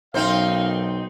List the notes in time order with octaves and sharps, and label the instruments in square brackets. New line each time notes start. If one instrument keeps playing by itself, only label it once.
[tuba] B1 [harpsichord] F#2 [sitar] C4 D#4 C5 [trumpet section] F5